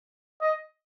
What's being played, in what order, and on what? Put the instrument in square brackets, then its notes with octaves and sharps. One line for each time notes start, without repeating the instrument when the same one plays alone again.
[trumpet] D#5